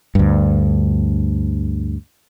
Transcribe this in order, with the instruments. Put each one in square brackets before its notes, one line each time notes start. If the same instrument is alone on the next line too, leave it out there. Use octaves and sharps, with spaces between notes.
[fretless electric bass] D2 G2